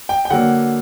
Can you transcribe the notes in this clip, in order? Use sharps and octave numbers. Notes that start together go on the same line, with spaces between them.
G5
G5
D3 F#3 A#3 F#5